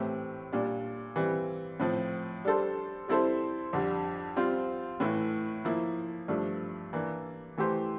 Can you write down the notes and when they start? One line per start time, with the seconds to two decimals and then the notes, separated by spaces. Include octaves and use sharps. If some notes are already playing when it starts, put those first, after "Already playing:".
Already playing: A2 E3 A3 C4 G4
0.53 A#2 G3 D4
1.16 E3 G3 C4
1.80 A2 F3 C4
2.45 G3 D4 A4 C5
3.08 G3 C4 E4 A4 C5
3.73 F2 D3 G3
4.36 G3 C4 F4 C5
5.00 A2 E3 A3 E4
5.65 F3 A#3 E4
6.28 G2 F3 A3 D4
6.93 E3 A#3 D4
7.58 E3 A3 E4 G4 C5